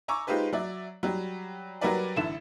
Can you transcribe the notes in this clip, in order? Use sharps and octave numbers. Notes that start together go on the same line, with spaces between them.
G#5 A#5 C#6 D6 E6
G#3 D#4 F4 G4 B4 C5
F#3 D5 E5
F#3 G3
F#3 G3 F#4 A#4 B4 D5
A1 D3 E4 A4 E7